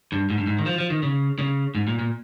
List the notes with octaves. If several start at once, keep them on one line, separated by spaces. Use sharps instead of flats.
G2
G#2
G2
G#2
D#3
F3
F3
D#3
C#3
C#3
G#2
A#2
A#2